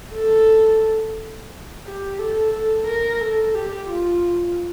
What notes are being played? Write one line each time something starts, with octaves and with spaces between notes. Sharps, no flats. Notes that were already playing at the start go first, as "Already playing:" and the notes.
A4
G4
A4
A4
A#4
A4
G4
F4